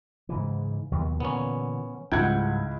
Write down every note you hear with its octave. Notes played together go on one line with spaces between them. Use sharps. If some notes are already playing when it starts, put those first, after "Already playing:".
G#2 C#3 E3
D#2 B2 F#3
A#2 D3 E3 B3 C#4
C#2 G#2 G3 E4 F#5 G5 G#6